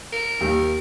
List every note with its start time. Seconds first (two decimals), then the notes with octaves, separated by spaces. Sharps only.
0.13 A#4
0.41 D#2